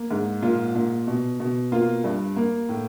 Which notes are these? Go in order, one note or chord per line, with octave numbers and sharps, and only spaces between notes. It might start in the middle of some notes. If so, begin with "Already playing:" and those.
Already playing: A#3
G#2
A#2 F4
A#2
B2
B2
A#3 F4
G2
A#3
A2